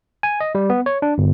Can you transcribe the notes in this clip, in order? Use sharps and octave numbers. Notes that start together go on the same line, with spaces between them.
G#5
D#5
G3
B3
C#5
D4
G1